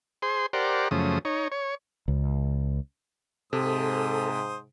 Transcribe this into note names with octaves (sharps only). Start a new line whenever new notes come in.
G#4 C5 C6
G4 A#4 C5 D5 F#5
F#2 C#3 F3 A3 D#6
D#4 C#5
C#5
C#2
G#2 C3 A4 C5 D#6